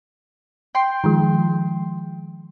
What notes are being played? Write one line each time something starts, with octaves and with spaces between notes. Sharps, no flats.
G5 C6
D#3 F3 G#3